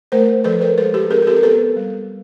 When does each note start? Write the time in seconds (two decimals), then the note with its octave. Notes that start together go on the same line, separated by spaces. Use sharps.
0.12 A3 A#4 C5
0.44 F3 A4 B4
0.61 A#4 C5
0.78 G#3 A4 B4
0.94 G4 A4
1.10 C4 G#4 A#4
1.22 A#4
1.27 G4 A4
1.36 A#4
1.43 B3 A4 B4
1.76 G3